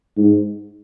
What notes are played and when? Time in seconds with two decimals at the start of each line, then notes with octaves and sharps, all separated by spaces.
0.17 G#2